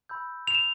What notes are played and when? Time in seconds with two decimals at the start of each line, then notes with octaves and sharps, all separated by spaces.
0.09 B5 E6 G6
0.47 F7
0.55 E7